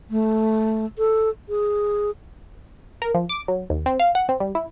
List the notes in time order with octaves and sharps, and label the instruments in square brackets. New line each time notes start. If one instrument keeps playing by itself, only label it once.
[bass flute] A3
A4
G#4
[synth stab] A#4
F3
D6
F#3
D#2
C4
F5
F#5
C4
G3
E4